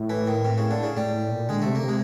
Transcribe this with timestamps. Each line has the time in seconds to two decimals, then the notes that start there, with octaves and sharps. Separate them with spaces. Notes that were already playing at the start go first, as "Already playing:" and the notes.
Already playing: A2
0.10 E3
0.27 D#3
0.45 C3
0.58 C#3
0.71 D3
0.83 C#3
0.96 A2 G3
1.14 A2
1.31 A#2
1.49 D3 G#3
1.62 C3 A3
1.75 A#3
1.83 C3
1.88 G#3